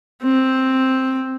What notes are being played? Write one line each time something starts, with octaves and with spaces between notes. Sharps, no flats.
C4